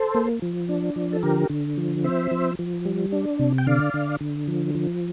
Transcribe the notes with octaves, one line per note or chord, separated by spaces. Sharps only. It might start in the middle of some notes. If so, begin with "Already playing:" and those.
Already playing: A4 C5
A#3
F3
D4
F3
A4
D3 G4 A#4
D3
F3
C4 C5 E5
F3
F3
G3
D4
C3
G5
D3 D5 F5
D3
D3
F3
F3